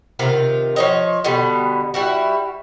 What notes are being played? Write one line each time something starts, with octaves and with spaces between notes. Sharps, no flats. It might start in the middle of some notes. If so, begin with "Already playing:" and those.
C3 D#3 F4
F3 C#5 D#5
B2 D3 G3
G3 E4 F#4